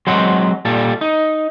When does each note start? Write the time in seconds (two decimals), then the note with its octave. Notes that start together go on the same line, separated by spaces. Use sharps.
0.07 F#3 G#3 C4 C5 D#5 F#5
0.65 A#2 G3 A4
1.01 D#4